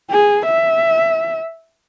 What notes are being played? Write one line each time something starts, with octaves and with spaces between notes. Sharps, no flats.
G#4
E5